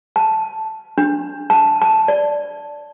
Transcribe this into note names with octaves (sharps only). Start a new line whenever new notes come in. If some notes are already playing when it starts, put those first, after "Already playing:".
A5
D4
A5
A5
D5